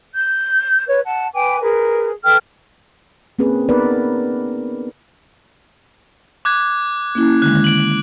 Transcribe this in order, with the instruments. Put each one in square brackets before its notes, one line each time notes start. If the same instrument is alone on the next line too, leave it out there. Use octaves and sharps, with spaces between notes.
[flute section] G6
B4 C#5
F#5 A5
B4 G5 G#5 D6
G#4 A#4 B4
A4 B4 G5 F6
[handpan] A#3 C4 C#4 G#4 B4
B3 D#4 A#4 B4 D5
[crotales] D6 F#6 G#6
[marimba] A#3 C#4 E4
[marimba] D3 D#3 G#3 [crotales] F#6
[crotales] D7 F#7